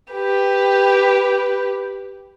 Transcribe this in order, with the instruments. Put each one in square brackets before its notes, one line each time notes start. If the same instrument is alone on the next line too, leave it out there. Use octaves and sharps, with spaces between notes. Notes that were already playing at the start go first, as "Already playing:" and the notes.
[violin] G4 B4